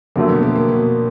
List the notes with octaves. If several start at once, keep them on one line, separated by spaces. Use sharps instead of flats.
F2 D3 F#3 A3 A#3
B2 B3
A#3
A#3
B2 B3